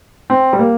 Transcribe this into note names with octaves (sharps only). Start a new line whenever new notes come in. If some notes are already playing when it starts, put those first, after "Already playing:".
C4
G3
A#3